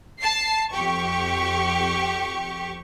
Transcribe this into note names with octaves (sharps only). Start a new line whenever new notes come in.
A5 C7
F2 G4 C#6